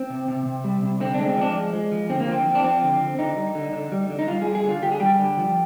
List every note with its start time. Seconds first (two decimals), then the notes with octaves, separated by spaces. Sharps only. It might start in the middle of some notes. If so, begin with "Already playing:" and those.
Already playing: C4
0.10 C3
0.28 C3
0.46 C3
0.64 G3
0.82 C3
1.00 D3 C4
1.14 G#3 D4
1.28 C4
1.37 F3 D4
1.55 G#3
1.73 G#3
1.92 F3
2.10 D3 C4
2.20 A#3
2.28 F3 C4
2.47 F3
2.55 D4
2.64 F3 C4
2.83 D3
3.01 D3
3.19 D3 D#4
3.37 G3
3.55 D3
3.73 D3
3.92 G3
4.10 D3
4.19 D#4
4.27 G3 F4
4.42 G#4
4.46 G3
4.55 G#4
4.64 D3 F4
4.82 D3 G4
4.92 G#4
5.00 G3 G4
5.19 D3
5.37 F3